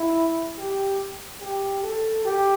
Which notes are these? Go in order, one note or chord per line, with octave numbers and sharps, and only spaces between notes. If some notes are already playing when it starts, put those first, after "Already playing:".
Already playing: E4
G4
G4
A4
G4